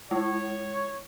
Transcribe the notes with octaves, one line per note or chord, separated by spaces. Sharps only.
G#3 E4 C#5